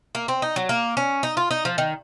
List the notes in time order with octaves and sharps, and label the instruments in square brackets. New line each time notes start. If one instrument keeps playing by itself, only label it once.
[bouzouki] A#3
C4
D#4
F#3
A#3
C#4
D#4
F4
D#4
F3
D#3